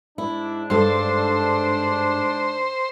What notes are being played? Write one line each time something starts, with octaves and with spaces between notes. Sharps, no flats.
G#2 D4 E4
G2 A4 C5